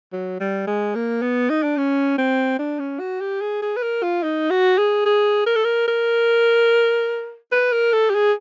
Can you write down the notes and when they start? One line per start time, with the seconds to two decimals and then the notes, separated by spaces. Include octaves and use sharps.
0.13 F#3
0.40 G3
0.67 G#3
0.95 A#3
1.22 B3
1.50 D#4
1.63 D4
1.77 C#4
2.18 C4
2.59 D4
2.79 C#4
3.00 F#4
3.21 G4
3.41 G#4
3.62 G#4
3.77 B4
3.82 A#4
4.03 F4
4.23 D#4
4.51 F#4
4.78 G#4
5.06 G#4
5.46 A#4
5.55 A4
5.65 A#4
5.88 A#4
7.52 B4
7.73 A#4
7.93 A4
8.10 G4
8.14 G#4